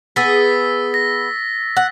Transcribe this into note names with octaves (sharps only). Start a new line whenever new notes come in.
B3 G#4 E6 A6 B6
A#6
F#5